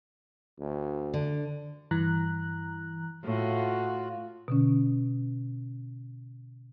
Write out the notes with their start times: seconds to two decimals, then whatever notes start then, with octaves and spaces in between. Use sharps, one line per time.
0.60 D2
1.14 D3
1.91 G2 E3 A#5 F#6
3.25 A2 F4 F#4
4.48 B2 D3 C#4